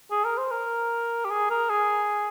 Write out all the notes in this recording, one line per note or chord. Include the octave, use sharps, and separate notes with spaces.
G#4
A#4
C5
A#4
G4
G#4
A#4
G#4